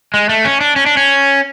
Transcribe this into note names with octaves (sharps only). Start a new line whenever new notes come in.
G#3
A3
C#4
D4
C#4
D4
C#4